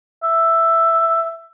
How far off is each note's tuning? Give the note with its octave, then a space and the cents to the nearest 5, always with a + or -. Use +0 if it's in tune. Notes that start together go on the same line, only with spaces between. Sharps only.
E5 +5